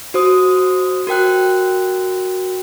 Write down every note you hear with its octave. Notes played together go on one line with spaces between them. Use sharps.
F#4 C5 D#6
F#4 A#4 G5 F#6